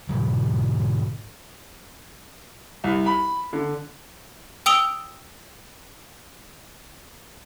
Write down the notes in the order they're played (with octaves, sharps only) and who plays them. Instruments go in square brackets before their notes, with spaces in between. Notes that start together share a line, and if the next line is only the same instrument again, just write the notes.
[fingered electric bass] G#2 B2 D3 F#3
[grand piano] C2
B5
D3
[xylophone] G5 D#6 E6 D7 F7 G7